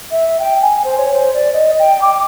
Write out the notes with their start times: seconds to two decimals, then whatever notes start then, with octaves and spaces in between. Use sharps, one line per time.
0.11 E5
0.40 G5
0.62 G#5
0.84 C5
0.98 C#5
1.14 C5
1.34 D5
1.54 D#5
1.79 G5
2.02 D6